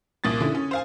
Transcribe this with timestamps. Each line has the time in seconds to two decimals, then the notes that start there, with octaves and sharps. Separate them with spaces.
0.24 C2 A#2 D#6 A6
0.40 D3 C#4 E4
0.55 C#4
0.71 C5 F5 G#5